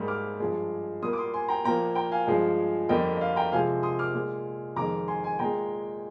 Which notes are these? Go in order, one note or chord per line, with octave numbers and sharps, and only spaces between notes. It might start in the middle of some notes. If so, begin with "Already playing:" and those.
Already playing: G#2 G3 A#3
D6 F6
G2 F3 G#3
A#2 G3 A#3 C6 D#6
D6
C6 D#6
G#5 C6
G5 A#5
A#2 F3 A#3 G5 A#5
G5 A#5
F5 G#5
G2 F3 G#3
F2 D3 G3 A#3 D#5 G5
D#5
F5
G5 A#5
C3 F3 G#3 F5 G#5
C6 D#6
D6 F6
A#2 G#3
F2 D#3 G#3 A#5 D6
G#5 C6
G#5 C6
A#2 G#3 G5 A#5